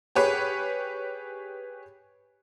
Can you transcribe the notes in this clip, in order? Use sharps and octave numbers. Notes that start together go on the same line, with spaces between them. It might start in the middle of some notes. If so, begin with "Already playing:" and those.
G4 G#4 B4 C#5